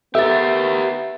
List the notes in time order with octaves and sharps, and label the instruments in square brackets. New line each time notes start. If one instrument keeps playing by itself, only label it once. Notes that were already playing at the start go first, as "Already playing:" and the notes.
[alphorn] B3 [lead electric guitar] G4 A#4 [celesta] A4 A6 [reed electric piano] E5